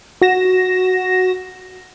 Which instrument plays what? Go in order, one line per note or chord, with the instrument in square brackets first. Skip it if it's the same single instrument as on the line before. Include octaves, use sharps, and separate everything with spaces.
[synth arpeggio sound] F#4 A#6 E7